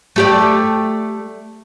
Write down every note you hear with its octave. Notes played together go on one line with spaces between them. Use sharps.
A3 G4 D5